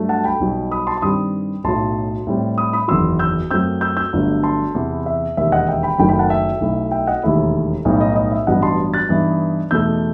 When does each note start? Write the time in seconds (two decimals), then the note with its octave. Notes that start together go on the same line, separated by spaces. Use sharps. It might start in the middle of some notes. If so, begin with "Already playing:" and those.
Already playing: G2 F#3 A3
0.09 F#5 A5
0.24 G5 B5
0.40 B1 B2 G3
0.72 B5 D#6
0.87 A5 C6
0.97 C6
1.02 G2 D#3 G3 C4 B5 D#6
1.64 B1 A2 F#3 A5 C6
2.27 A2 G3 C4
2.58 B5 D#6
2.73 B5 D#6
2.88 F#1 E2 D#3 F#3 C6 E6
3.19 E6 G6
3.50 F#2 F#3 A3 C4 E6 G6
3.81 E6 G6
3.97 E6 G6
4.13 G1 G2 F#3 A3
4.43 A5 C6
4.75 E2 C3 E3
5.06 E5
5.37 E1 D#2 D#3 E5
5.52 D#5 F#5
5.67 E5 G5
5.83 G5 B5
5.98 F#1 F#2 D#3 F#3 A3 G5 B5
6.09 G5 B5
6.19 F#5 A5
6.30 E5 G5
6.61 B1 B2 A3 E4
6.91 E5 G5
7.07 D#5 F#5
7.23 E1 D#2 D#3 A3 E4 E5
7.85 B1 A2 G3 B3 D#4 D#5
8.00 D#5
8.16 D#5
8.32 E5
8.47 A1 G2 F#3 B3 D#5 F#5
8.63 A5 C6
8.94 F#6 A6
9.09 G2 E3 B3 D#4
9.71 E2 B2 A3 D#4 E6 G6